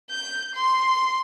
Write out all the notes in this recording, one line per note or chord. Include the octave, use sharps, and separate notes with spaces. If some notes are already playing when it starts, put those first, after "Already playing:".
G6
C6